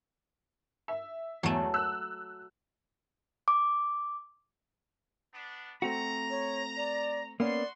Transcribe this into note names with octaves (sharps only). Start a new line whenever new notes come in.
E5
E2 F#3 A3
E6 F#6
D6
B3 D4
A3 C4 F#4 A#5
C#5
D5
A#3 B3 C#4 F#4 D5 C6